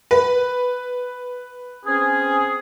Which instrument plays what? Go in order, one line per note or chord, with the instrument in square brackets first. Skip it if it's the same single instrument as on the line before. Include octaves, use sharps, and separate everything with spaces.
[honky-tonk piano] B4
[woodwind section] C4 C#4 G#4